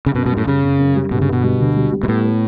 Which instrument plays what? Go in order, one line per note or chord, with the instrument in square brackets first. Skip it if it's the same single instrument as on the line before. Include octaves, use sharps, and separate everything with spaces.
[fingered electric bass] C#3
[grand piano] F#2 [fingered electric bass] B2
[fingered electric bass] B2
[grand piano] G3
[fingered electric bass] A2
[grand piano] F#1 [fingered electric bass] C#3
[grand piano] F#1
F#2
G3
[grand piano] G1 [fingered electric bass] B2
[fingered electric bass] C#3
[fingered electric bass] B2 [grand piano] B3
[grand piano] G3
D2
G3
G3
[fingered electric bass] B2
[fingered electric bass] A2 [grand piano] B3
[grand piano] B3